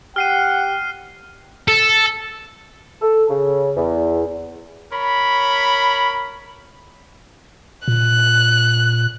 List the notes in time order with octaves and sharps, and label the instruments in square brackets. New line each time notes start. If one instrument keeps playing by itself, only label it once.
[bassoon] G4 [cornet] F#5 [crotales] F6 C7 D#7
[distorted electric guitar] A4
[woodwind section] A4
C#3
E2
[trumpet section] A#4 C#5 B5
[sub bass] A#2 [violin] F#6